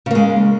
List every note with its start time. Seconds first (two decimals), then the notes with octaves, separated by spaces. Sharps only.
0.06 C#3
0.11 A#3
0.15 G#3